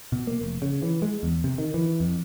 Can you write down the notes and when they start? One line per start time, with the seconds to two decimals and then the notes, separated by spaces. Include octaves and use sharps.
0.12 B2
0.27 A#3
0.42 F1
0.62 C#3
0.83 E3
1.02 G#3
1.23 E2
1.44 C3
1.58 D#3
1.74 E3
2.00 F2